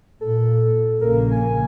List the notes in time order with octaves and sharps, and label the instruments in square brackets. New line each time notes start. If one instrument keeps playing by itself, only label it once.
[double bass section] A#2 [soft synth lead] A4
[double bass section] A#1 C#3 A#3 [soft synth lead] A#4
[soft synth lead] G#5